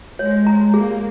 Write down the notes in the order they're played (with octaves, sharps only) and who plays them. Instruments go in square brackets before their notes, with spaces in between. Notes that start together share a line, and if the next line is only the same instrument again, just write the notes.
[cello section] G#3 [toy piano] C#5
[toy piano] A#5
[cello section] A#3 [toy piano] G#4